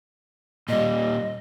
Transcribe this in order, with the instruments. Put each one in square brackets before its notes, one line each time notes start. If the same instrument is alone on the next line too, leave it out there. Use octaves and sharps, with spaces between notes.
[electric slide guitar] A#2 G3 [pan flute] D#5